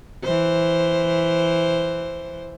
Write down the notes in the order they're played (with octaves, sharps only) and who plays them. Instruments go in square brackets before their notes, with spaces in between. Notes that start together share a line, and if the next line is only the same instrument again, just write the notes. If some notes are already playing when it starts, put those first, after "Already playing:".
[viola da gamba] E3 C5